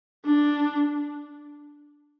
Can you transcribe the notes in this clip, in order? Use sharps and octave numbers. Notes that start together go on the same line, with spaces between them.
D4